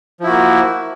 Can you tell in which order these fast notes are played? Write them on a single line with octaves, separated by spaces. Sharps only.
F3 E4 F#4 A#3